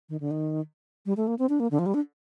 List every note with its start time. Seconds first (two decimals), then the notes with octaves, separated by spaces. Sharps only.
0.09 D#3
0.20 D3
0.31 D#3
1.06 G3
1.17 A3
1.27 A#3
1.39 C4
1.49 D4
1.60 A#3
1.71 D3
1.79 F3
1.86 G3
1.94 D4